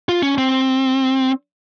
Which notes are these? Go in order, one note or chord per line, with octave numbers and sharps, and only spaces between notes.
F4
C#4
C4